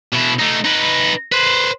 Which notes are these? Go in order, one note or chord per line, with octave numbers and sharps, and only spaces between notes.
B2 E4
A3 D#4
D#4 B4
B4 C5